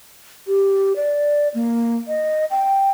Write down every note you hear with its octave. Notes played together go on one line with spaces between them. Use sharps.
G4
D5
A#3
D#5
G5